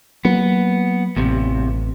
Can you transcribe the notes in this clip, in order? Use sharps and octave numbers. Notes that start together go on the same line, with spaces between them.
F#3 A#3 B3
A1 E2 C3